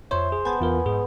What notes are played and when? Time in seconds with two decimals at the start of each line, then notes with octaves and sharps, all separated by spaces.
0.11 F2 C5 C#5 E5
0.32 G#4
0.45 B3 G#5 A5 G6
0.61 E2 F4 A#4
0.86 G#2 G#4